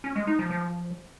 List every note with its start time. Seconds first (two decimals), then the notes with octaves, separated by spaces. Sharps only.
0.04 C#4
0.16 G#3
0.27 D#4
0.39 F3
0.51 F3